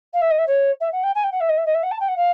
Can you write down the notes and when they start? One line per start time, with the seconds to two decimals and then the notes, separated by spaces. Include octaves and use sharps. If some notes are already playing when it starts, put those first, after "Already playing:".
0.13 F5
0.21 E5
0.30 D#5
0.38 E5
0.46 C#5
0.80 E5
0.92 F#5
1.03 G5
1.14 G#5
1.23 G5
1.31 F#5
1.40 E5
1.48 D#5
1.57 E5
1.65 D#5
1.74 E5
1.82 F#5
1.91 A5
1.99 G5
2.08 F#5
2.16 F5